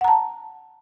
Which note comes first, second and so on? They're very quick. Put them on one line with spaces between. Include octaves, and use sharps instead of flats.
F#5 A#5 A5